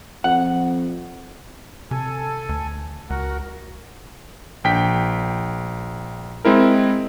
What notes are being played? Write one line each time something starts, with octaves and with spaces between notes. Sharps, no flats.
F2 F#5
C3 A4 G#5
D2
C#2 F#4 A#4 F#5
A#1 G5 B6
G#3 C4 E4 A#4